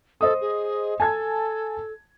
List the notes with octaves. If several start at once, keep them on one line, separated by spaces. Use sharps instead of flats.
A4 C5 D#5 D#6
G#4
A4 G#5 A5 G#6